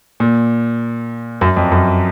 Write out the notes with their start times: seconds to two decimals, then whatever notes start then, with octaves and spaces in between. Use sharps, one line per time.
0.20 A#2
1.41 F#2
1.56 F2
1.72 F#2